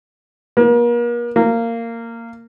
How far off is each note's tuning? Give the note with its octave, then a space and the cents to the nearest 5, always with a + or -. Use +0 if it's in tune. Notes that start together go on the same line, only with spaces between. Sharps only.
A#3 +40
A#3 -15